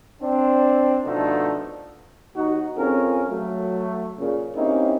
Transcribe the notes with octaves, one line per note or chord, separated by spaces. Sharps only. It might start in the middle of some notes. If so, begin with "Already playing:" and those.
C4 D4
B2 D3 F3 A3 D4 D#4
D#2 D#4 F#4
F2 C4 C#4 F4 G#4 A#4
F#3 A3
A#2 C#3
A#3 C4 C#4 D#4 E4 G4